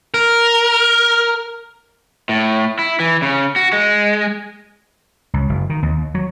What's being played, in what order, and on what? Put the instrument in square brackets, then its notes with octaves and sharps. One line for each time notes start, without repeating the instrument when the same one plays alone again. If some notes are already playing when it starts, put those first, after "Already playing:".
[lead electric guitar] A#4
[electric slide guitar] A2
E4
E3
C#3
F#4
G#3
[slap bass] C#2
F#1
D#3
D#2
F#3